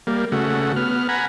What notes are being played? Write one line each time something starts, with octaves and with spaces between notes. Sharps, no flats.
G3 A#3
C#3 A3 F#4
B3 F6
F#5 G#5 A#5 B5